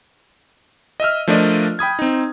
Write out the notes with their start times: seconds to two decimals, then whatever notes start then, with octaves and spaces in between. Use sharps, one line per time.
1.00 D#5 E5 E6 F6
1.27 F3 A3 D4 A#4 D5 D#5
1.79 G5 B5 D#6 G#6
1.99 C4 D#4